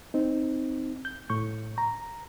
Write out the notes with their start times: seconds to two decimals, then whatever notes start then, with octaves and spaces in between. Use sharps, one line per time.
0.14 C4 D#4
1.05 G6
1.29 A2 C#6 G6
1.78 A#5